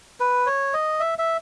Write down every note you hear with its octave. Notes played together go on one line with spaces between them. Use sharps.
B4
C#5
D#5
E5
E5